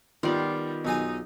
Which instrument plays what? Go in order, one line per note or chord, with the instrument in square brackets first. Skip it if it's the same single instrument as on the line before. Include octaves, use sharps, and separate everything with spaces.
[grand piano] D#3 B3 [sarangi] G3 [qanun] F4 D5
[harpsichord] B1 G#4 G#5 [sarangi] D#4